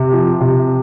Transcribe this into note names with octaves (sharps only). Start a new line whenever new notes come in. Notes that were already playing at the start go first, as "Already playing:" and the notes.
Already playing: C3
F3
C3